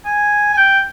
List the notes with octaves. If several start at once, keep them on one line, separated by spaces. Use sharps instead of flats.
G#5
G#5
G5